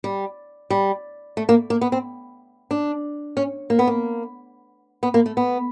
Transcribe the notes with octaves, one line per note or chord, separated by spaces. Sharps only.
G3
G3
A3
A#3
A#3
B3
C4
D4
C#4
A#3
B3
A#3
B3
A#3
A3
B3